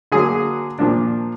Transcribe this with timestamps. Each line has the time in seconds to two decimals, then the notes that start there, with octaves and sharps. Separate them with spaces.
0.12 D3 F#3 A#3 G#4
0.79 A#2 F3 A#3 D4